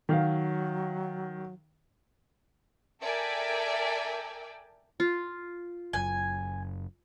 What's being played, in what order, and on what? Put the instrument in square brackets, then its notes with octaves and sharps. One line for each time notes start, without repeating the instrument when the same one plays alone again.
[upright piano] D#3 F5 [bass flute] F#3
[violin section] A4 A#4 D5 E5 G5 G#5
[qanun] F4
[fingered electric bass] F#1 F#2 [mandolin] G#5